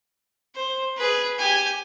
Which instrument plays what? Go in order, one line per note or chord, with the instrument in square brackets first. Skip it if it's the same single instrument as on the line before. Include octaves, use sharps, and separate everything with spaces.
[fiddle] C5
G#4 B4
G4 G#5